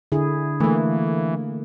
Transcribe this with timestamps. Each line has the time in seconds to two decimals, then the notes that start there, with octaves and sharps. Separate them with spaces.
0.12 D3 E4 G#4
0.60 E3 A3 A#3